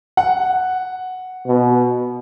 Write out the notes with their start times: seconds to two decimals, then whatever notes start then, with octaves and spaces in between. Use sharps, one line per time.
0.17 F#5
1.47 B2